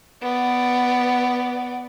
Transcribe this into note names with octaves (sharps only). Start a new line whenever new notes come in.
B3 D5